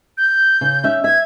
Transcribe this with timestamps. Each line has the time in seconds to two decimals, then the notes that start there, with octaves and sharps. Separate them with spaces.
0.18 G6
0.61 C#3
0.84 C#4 E5
1.04 E5 G#6